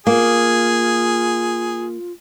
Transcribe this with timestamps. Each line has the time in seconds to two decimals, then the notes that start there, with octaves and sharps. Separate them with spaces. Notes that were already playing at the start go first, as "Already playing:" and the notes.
0.07 A#3 F4 G#4